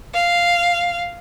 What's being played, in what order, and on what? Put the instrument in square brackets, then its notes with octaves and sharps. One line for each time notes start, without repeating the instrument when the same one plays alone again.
[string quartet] F5